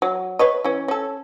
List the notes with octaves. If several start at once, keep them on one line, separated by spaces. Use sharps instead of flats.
F#3
B4 C#5 D#5
E3 C#4
C#4 A4